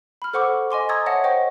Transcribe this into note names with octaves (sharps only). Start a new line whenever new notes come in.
B5 F6
A4 C5 F#5 C#6 D6 E6
D#5 G#5 C6 D6
A#5 C#6 D#6 E6 G#6 A6
C#5 E5 F#5 A5 A#6
C5 D#5 F#5 G5 C#6